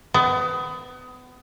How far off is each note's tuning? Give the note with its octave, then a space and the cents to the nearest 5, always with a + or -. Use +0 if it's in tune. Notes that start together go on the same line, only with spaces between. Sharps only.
B3 +30